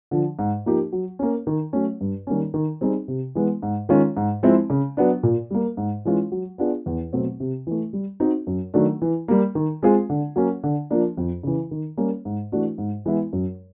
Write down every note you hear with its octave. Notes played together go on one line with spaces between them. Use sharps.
D3 F3
G#2
F3 A#3 D#4 G4
F#3
A#3 C#4
D#3
F#3 A3 C#4
G2
D#3 G3 A#3 C#4
D#3
G3 C4 D#4 G#4
C3
E3 G#3 B3
G#2
D#3 G#3 C#4 F4
G#2
F3 G#3 C4 E4
C#3
F#3 B3 D4
A#2
G3 A#3
G#2
E3 G#3 C#4 F4
F#3
B3 D4 F4 G#4
E2
B2 F#3 A3 C4
C3
E3 A3
G3
C4 D#4 F#4
F#2
D#3 F#3 A3 D4
E3
G3 A#3
D#3
G#3 C4 F4 G#4
D3
F#3 A#3 C#4
D3
F3 A#3 D4
F2
C#3 E3
D#3
G3 A#3 C#4
G#2
E3 A3 D4 F#4
G#2
E3 G#3 B3 E4
F#2